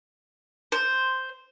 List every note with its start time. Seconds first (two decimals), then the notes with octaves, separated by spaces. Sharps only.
0.72 C5